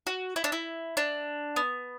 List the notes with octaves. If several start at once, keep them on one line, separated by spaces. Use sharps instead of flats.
F#4
E4
D4
E4
D4
B3